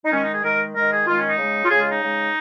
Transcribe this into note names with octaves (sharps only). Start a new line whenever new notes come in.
D#4
D#3 G#3 C#4
D#4
G#4
D#3 G#3 A#4
D#3 G#3 A#4
G#4
D#3 G#3 F4
C#4
D#4
C#3 G#3
F4
C#3 G#3 G#4
F4
D#4
C#3 G#3